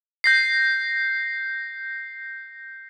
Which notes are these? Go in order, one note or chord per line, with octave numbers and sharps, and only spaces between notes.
G6 A#6 C7